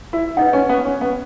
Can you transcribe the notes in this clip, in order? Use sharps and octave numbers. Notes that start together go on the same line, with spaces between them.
E4
D#4 B4 D#5 F#5
C#4
B3
C#4
B3